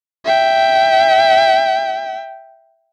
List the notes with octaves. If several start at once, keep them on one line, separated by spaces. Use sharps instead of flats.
E5 G5